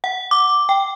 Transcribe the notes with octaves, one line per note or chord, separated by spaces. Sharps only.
F#5
D6
G5